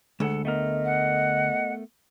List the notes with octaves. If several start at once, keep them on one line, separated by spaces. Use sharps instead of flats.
D2 G#3 A4 F#5
A3 B3 A#4 D#5
F#5